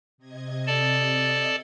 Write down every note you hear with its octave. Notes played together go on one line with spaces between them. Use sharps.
C3 D#5 G#6
A4 D5 A5